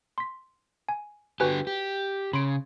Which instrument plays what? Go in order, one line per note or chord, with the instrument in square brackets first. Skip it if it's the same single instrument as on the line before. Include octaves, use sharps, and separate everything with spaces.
[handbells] C6 B6
G#5
[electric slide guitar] D3 G4 [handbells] F#4 B4 G#5
[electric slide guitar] G4
[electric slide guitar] C#3 [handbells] B5 C6 D7